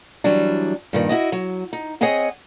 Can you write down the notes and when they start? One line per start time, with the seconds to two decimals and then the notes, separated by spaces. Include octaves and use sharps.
0.24 E3 F#3 G3 D4
0.93 G2 A#2 D#3
1.09 E4 F#4 D#5
1.32 F#3
1.73 D#4
2.01 C4 G#4 C#5 D#5 F#5 G#5